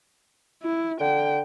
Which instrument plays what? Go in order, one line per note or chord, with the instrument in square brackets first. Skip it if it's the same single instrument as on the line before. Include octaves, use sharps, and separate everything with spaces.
[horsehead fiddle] E4
[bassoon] D3 [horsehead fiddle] G5